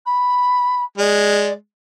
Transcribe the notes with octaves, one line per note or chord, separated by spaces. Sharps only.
B5
G#3 D5